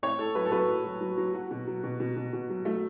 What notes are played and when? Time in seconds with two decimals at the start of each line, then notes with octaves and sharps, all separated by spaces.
0.03 A2 C#5
0.19 A2 A4
0.35 F#3 B4
0.45 A4
0.52 F#3 B4
0.68 A2
0.85 F#3
1.01 F#3
1.18 F#3
1.34 F#3 F#4
1.51 B2
1.67 F#3
1.84 B2
2.00 B2
2.16 B2
2.33 B2
2.49 F#3
2.65 F#3 A3